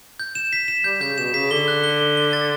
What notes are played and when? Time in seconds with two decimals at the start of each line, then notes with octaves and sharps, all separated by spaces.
0.20 G6
0.35 E7
0.53 B6
0.68 E7
0.84 G3 G6
1.01 C#3 G6
1.18 B2 E7
1.34 C#3 B6
1.51 D3 G7
1.68 F#6
1.84 G7
2.01 G7
2.17 G7
2.33 A6